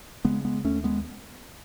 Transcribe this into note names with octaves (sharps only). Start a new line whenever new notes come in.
C#3 G#3 B3
G#3 B3
D#2 A3 C#4
G#3 B3